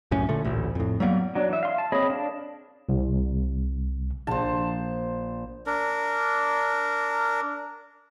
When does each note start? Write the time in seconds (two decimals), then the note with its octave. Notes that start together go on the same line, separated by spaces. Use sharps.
0.11 C2 F#2 A2 C#4
0.29 A#2 D3 A3
0.45 A1 D2 A#2
0.75 F2 A2
1.00 F#3 G3 A#3 B3
1.35 F#3 D4
1.49 E3 E5
1.63 F5 C6
1.78 A5
1.92 C4 G#4 C#5 D#5 B5
2.10 D4 A#4 F5 A5
2.89 C2
4.27 A#1 C5 A5
5.67 D4 A#4